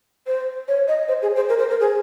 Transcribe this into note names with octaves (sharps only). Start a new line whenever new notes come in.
C5
C#5
D#5
C5
G#4
C5
A#4
C5
A#4
G#4